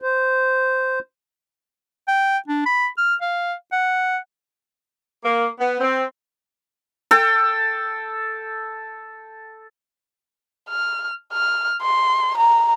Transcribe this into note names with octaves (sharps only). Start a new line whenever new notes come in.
C5
G5
D4
B5
F6
F5
F#5
A#3
B3
C4
A4 G5
F6
F6
C6
A#5